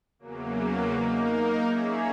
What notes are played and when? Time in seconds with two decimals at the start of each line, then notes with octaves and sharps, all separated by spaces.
0.19 E2 C#3 F#3 A#3
0.92 A#3 D#4 A#4
1.64 A#3 C#4 G#4 C#5 E5